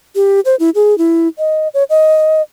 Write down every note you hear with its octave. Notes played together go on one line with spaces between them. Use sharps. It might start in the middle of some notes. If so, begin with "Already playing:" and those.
G4
C5
E4
G#4
E4
D#5
C#5
D#5